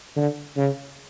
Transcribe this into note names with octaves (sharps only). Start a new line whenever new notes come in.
D3
C#3